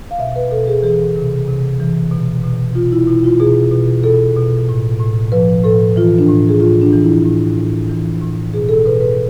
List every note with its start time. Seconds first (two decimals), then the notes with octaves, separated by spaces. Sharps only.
0.11 F5
0.19 B2 E5
0.36 B4
0.51 B2 A4
0.67 G#4
0.83 E3 G#4
1.16 C3
1.48 C3
1.80 E3
2.11 B2
2.44 B2
2.75 B2 F4
2.92 E4
3.08 B2 E4
3.24 F4
3.39 B2 G#4
3.72 B2
4.04 B2 A4
4.37 B2
4.69 A2
5.00 A2
5.32 F3 B4
5.64 A2 A4
5.96 E3 F4
6.19 D4
6.29 A2
6.49 G#4
6.60 A2 F4
6.82 D4
6.93 E3
7.03 E4
7.25 A2
7.57 A2
7.89 E3
8.22 A2
8.54 B2 G#4
8.69 A4
8.85 B2 B4
9.01 B4